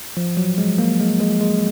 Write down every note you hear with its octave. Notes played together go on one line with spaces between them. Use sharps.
F3
F#3
G#3
A#3
G#3
G#3
G#3